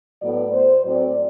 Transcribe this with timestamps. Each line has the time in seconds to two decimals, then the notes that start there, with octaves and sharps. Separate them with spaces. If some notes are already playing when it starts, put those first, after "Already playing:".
0.21 A2 F#3 B3 D5
0.53 C5
0.84 A2 F#3 C4 D5